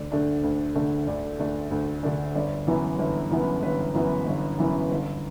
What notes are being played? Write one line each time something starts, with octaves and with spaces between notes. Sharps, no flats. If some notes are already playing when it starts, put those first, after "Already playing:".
Already playing: D2 D5
D3 A3 D4
D2
D3 A3 D4
D2 D5
D3 A3 D4
D2
D3 A3 D4
G1 D5
F#2 E3 B3
G1
F#2 E3 B3
G1 B4
F#2 E3 B3
G1
F#2 E3 B3
G1